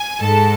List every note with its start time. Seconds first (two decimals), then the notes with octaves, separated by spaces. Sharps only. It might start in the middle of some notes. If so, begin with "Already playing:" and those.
Already playing: G#5
0.20 G#2 G#3 A4 A5